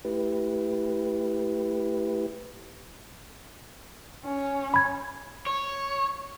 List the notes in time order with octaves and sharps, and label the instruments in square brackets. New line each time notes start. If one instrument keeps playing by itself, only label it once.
[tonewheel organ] A3 E4 G4 B4
[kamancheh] C#4
[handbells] B5 G#6
[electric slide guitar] C#5